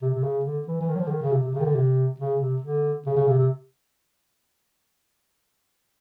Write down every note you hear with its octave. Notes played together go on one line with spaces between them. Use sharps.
C3
C3
C#3
D3
E3
E3
D#3
F#3
F3
D3
D#3
C#3
C3
C3
C#3
D#3
D3
C3
C#3
C3
D3
C#3
C#3
C3
C3